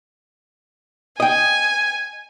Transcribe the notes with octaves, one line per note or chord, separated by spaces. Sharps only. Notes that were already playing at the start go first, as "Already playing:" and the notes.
D#5 G5 G#5